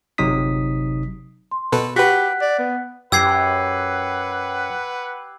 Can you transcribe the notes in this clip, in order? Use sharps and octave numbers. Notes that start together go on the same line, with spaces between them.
G1 C3 F#3 D#4 D#6 B6
C6
B2 A4 B4
F#4 G4 B4 F#5 F#6 B6
D5
B3
F#2 G4 B4 F#5 E6 G#6 C7